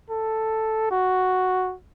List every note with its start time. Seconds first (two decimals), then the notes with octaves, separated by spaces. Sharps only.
0.10 A4
0.91 F#4